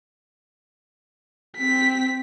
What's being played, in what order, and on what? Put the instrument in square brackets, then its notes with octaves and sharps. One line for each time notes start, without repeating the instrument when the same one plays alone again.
[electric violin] C4 B6